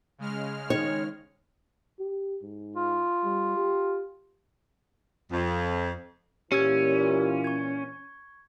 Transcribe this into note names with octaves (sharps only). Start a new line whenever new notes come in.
C#3 G#3 F6
D#3 C#5
G4
G#2
F4
G3
G4
F2
A#2 E3 C#4 G4 E6 G#6
C#6 G#6